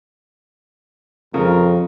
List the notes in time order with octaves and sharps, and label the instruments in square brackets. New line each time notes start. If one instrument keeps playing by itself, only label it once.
[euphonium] F2 [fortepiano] C#3 [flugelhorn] A#4